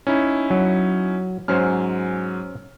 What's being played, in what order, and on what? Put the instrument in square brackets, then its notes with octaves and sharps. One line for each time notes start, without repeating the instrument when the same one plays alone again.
[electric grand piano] C#4 D#4 E4
[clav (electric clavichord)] F#3
[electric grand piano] G#2 F#3 F6 [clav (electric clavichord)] C#4 C5 G#5